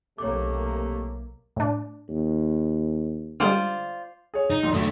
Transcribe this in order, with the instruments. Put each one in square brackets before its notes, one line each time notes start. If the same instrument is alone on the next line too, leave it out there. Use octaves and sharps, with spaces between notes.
[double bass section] B1 A#3 [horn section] C3 A3 [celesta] C#5 D6
[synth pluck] A2 D4
[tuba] D#2
[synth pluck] D3 G3 G#3 [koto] F4 C5 D5
[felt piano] G#4 C#5
[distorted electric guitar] D#4
[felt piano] B1 E2 C6
[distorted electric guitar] D3 A3